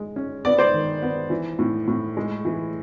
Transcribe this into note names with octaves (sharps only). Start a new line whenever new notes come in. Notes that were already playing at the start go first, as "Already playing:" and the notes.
Already playing: G#3
C#4
B3 D5
C5 D5
D#3
B3
E3
A2
A2
G#3
E3